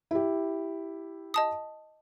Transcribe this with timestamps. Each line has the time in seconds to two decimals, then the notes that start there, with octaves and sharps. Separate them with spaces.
0.11 E4 G4
1.34 D#5 A5 D#6